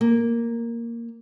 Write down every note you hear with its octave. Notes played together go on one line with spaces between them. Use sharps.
A#3